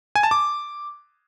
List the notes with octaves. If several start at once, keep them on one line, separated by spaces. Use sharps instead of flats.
G#5
A5
D6